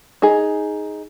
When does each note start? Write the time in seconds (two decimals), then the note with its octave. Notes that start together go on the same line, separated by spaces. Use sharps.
0.22 D#4 G#4